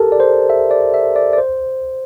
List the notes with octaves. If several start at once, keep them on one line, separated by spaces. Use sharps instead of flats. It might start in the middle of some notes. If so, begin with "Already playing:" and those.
Already playing: G4 A4 A#4 A5
D5
C5
E5
D5
E5
D5
D5
C5